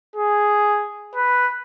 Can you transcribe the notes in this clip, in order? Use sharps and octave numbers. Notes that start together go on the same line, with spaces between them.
G#4
B4